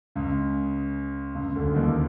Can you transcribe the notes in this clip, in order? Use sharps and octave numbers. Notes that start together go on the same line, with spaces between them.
C#2 C#3
C#2 C#3
D2 D3
D#2 D#3